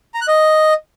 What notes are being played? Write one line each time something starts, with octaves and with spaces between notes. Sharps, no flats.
A#5
F#6
D#5